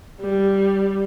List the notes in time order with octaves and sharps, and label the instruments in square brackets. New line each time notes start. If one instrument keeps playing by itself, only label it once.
[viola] G3